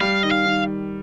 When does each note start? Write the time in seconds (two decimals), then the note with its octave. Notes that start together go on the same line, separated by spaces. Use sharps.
0.01 G3 F5
0.23 D#3 D#5
0.31 F5
0.46 D#3